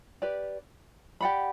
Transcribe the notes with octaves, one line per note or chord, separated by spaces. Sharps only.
G4 B4 D5
G4 D5 F#5 B5